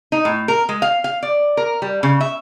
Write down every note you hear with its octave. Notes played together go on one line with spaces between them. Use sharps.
D#4
A2
A#4
G#3
F5
F5
D5
A#4
G3
C#3
E5